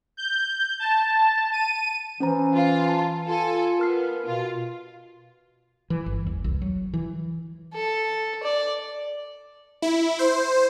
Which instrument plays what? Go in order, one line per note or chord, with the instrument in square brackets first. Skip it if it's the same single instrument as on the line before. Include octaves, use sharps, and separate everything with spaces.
[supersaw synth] G6
A5
D#7
[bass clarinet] E3 [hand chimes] C#4 C5 A#5
[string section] F4
[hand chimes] A5
[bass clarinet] F4 [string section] A4 G#5
[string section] B3 [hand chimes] A#4 F6 C7
[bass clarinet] B2 [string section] F4
[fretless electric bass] E3
G1
E2
C2
F#3
E3
[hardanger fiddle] A4
D5
[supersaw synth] E4
C5